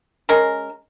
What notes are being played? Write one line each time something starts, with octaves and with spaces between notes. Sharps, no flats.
G#3 C#4 A#4